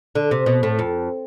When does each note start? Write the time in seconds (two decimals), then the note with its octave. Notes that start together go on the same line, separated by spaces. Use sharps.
0.15 D3
0.31 C3
0.46 B2
0.63 A2
0.79 F2